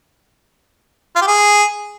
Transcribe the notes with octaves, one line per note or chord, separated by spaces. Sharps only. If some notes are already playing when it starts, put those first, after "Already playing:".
F4
G4
G#4